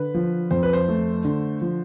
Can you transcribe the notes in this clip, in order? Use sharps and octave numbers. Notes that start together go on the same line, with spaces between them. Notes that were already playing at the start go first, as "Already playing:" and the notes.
Already playing: D3 B4
F3
F2 C5
B4
C5
A3
D3
F3